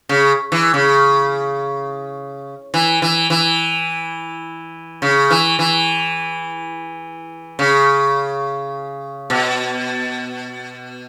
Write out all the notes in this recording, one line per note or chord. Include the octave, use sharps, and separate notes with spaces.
C#3
E3
C#3
E3
E3
E3
C#3
E3
E3
C#3
B2